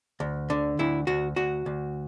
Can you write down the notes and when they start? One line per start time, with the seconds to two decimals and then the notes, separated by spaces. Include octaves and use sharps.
0.20 D2
0.50 D3
0.79 D2 E4
1.07 D2 F#4
1.36 D2 F#4
1.66 D2